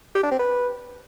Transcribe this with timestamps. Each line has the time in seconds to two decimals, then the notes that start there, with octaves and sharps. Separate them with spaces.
0.15 G4
0.23 D4
0.31 C4
0.39 B4